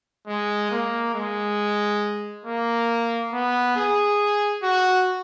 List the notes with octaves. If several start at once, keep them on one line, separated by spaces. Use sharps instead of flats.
G#3
A#3
G#3
A#3
B3
G#4
F#4